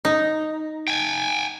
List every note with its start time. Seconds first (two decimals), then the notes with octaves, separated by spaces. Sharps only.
0.05 D#4
0.88 G5 G#5